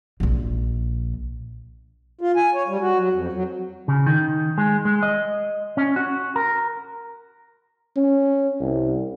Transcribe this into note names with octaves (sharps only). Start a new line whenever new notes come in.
A#1 A#2
F4
G#5
C#5
G3
F#4
F#3
F2
F#3
C#3
D#3
G#3
G#3
D#5
C#4
F#4
A#4
C#4
C2